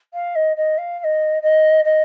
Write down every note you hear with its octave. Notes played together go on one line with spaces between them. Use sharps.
F5
D#5
D#5
F5
F5
D#5
D#5
D#5